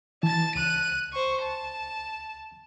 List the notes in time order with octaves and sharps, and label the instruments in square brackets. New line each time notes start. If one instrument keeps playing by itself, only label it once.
[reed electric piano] E3 [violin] A5 A6
[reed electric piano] C#2 [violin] F#6 D#7
[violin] C5 C#6
A5